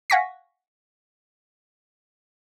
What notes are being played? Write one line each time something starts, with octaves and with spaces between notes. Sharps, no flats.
F5 F#5 G#5 C#6 A#6 B6